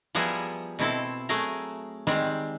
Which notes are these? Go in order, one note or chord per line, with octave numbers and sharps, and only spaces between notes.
F3 G3 B3 E4 G#4 A#4
B2 C4 E4 A4
F#3 A3 G#4 A#4
D#3 G3 G#3 C4